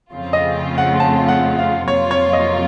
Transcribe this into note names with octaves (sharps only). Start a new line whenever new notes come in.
F2 C#3 A3 C4 F4
D#5
F#5
A5
F#5
F5
F2 C3 F#3 A#3 F4 C#5
C#5
D#5